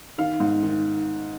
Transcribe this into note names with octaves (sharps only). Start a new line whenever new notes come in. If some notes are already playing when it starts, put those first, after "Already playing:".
D#3 F5
G#2
D#3